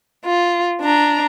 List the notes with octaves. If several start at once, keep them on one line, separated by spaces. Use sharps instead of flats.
F4
D4 A#5